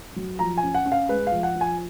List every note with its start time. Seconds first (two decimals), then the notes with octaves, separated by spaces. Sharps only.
0.16 F#3
0.39 F3 A#5
0.58 G#5
0.63 C#4
0.75 F#5
0.85 C#4
0.92 F5
1.09 G#3 B4
1.27 F3 F5
1.43 F#5
1.55 F3
1.61 G#5